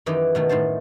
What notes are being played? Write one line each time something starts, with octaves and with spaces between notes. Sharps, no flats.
F#2 D#3 E3 G4 D#5
B2 D#3 A3
A2 D#3 C5 A5